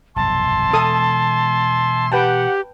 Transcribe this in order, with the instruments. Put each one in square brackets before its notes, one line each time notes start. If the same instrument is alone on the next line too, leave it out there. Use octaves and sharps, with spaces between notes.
[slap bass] F1 B1 G2 [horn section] E5 G#5 C6 [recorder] A5
[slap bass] B2 E3 G#3 [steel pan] A4 D#6
[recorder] G4 [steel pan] B4 G5 A5 [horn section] F#5